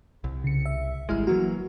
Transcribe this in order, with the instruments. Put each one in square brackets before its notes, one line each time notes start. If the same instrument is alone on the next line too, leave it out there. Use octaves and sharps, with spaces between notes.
[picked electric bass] C2
[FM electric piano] C#3 C#7
E5
[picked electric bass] G#1 G#3 [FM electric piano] G3 E4 F6
[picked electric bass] E3 F#3 A#3 [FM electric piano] F#4